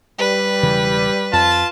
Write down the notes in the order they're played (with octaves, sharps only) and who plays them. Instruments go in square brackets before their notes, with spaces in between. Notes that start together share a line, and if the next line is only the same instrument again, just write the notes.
[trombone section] G3 [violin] B4
[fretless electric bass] E1 C#3 E3
[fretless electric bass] F2 [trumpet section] F4 A5